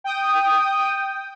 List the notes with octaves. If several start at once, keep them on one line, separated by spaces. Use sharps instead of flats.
G5 D#6